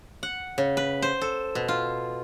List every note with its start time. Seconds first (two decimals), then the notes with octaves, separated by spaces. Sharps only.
0.23 F#5
0.58 C#3
0.77 B4
1.02 C5
1.21 A4
1.55 B2
1.68 F4